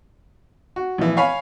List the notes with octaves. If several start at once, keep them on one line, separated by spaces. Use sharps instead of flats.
F#4
A#1 E3
C#5 F5 G#5 B5